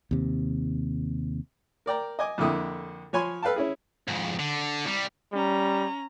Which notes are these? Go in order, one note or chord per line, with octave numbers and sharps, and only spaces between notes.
D#2 C3
A#4 D5 G5 A#5
D#5 G#5 D6
F2 D3 A#3 E4 G5 D#6
F3 C#5 G#5 B5 C6
A4 B4 F5 G5 A5
C#4 E4 G#4
F2 G#2
D3
C2 G3
G3 C#4 A#5